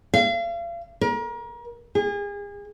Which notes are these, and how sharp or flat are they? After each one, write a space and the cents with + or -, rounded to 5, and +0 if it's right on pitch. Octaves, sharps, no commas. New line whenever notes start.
F5 -40
A#4 +35
G#4 -35